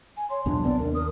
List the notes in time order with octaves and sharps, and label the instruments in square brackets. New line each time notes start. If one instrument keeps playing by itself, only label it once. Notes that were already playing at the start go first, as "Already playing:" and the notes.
[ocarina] G#5
[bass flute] C#5 [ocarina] C6
[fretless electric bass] B1 E2 A#2 [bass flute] D4
[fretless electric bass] C3 B3 C4 [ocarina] D5
[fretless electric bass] D#2 [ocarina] A#4
[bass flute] A#4 [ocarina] D#6